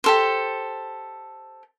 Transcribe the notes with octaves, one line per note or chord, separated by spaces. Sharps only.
G4 A4 C5